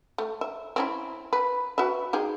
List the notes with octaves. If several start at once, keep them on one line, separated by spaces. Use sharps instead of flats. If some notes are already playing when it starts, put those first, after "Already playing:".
A3
E5
C4 C#4 E4
B4
F#4 B4 E5
D#4 G4 G#4